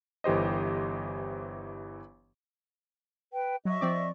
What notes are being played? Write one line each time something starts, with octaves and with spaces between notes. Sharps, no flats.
G1 E3 G4 C5 D#5
B4 G5
F#3 D#5 E5 C#6
F3 C4 D5